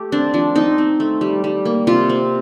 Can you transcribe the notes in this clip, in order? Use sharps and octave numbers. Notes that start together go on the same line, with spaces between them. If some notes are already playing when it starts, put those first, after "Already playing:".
Already playing: A3 G4
C4 D4
F3 D4
C4 D#4
C4
A3
G3
G3
A#3
C3 F4
C4